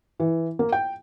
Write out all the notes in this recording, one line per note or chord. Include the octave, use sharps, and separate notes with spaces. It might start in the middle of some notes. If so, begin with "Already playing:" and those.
E3
A#3
G5